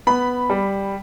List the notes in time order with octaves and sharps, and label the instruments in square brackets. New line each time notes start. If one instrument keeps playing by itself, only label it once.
[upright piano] B3 [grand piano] B5
[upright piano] G3